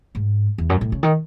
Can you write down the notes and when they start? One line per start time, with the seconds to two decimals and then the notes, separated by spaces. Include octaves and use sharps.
0.15 G#2
0.58 E2
0.69 F#2
0.81 A2
0.92 C#3
1.03 D#3